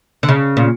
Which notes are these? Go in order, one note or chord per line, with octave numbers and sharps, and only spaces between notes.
D3
C#3
A#2